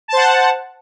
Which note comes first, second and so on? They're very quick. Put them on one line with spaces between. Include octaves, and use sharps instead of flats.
A5 C5 F#5